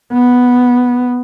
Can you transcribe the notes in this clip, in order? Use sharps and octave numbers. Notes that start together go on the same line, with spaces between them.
B3